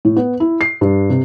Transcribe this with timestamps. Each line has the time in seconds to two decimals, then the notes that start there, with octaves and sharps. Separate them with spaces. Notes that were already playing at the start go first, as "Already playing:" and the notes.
0.05 A2
0.16 B3
0.40 E4
0.61 C7
0.81 G2
1.10 C3